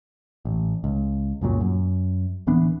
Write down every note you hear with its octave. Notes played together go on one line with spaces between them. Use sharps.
A1
C#2
C#2 F#2 A#2 F#3
F#2
D1 E3 B3 D4